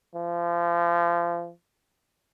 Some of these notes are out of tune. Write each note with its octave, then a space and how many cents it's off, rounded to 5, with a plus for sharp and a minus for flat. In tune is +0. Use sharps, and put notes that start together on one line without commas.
F3 -30